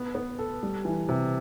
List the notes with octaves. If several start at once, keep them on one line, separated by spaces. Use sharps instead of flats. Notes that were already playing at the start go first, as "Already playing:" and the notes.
Already playing: B3
B3
A4
G3
E3
C3